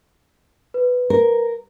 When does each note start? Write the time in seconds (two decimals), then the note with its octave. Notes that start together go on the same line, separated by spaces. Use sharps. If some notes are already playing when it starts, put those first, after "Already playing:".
0.74 B4
1.10 A#4